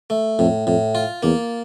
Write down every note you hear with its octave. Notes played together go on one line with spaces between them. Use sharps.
A3
F2 A2
F2 A2
F4
E2 A#3